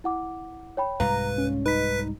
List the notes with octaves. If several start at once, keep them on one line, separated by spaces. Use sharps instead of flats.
E4 F#5 D6
C#5 G5 B5
C2 G#2 G3 B4 F5 A#5
C#4
D#4 B4 B5 B6